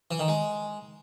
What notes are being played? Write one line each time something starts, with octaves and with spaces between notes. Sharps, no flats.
E3
D#3
G#3